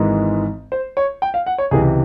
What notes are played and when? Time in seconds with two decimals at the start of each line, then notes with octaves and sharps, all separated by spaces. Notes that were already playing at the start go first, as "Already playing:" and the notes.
Already playing: G#1 G#2 E3 G#3
0.72 C5
0.97 C#5
1.22 G5
1.34 F5
1.46 F#5
1.58 C#5
1.71 C#2 C3 E3 G#4